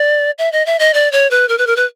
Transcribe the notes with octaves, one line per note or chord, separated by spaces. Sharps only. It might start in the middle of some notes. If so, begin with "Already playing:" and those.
Already playing: D5
E5
D#5
E5
D#5
D5
C#5
B4
A#4
B4
A#4
B4